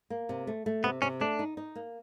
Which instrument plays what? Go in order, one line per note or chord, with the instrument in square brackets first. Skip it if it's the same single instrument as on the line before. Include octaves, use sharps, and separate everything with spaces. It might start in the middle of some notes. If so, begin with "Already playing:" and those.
[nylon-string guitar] A#3
C3
A3
A3
[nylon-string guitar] C3 [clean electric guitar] B3
[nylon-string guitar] C3 [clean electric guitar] C#4
[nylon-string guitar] A3 [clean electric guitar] D4
[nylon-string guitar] D#4
D#4
A#3